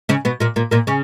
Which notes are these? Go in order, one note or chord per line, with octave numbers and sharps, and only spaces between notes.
C#3 C#4
B2 B3
A#2 A#3
A#2 A#3
A#2 A#3
C#3 C#4